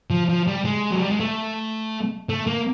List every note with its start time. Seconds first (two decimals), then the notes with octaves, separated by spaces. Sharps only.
0.10 F3
0.29 F3
0.47 G3
0.65 G#3
0.91 F#3
1.00 G3
1.11 G#3
1.20 A3
2.29 A3
2.47 A#3